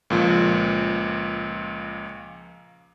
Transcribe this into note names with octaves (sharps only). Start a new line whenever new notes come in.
C#2 A#2 F3